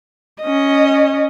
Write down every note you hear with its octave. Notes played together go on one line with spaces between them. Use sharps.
C#4 D#5